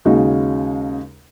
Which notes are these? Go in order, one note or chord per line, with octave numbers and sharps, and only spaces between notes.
D#2 C#3 G#3 D#4 F#4